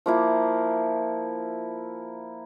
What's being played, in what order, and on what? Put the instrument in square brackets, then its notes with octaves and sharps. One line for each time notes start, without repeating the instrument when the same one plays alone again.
[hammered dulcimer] F3 A#3 E4